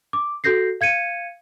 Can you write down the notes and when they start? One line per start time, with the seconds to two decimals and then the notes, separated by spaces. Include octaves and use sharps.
0.13 D6
0.44 F#4 A4 G6 A#6 C7
0.81 F5 G#6 C#7 D#7